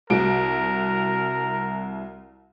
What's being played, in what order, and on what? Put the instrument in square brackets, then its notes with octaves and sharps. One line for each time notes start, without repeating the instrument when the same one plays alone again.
[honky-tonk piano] C2 F#4 D7 [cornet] A#4